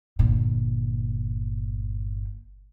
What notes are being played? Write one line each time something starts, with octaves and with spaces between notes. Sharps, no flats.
G1 A#2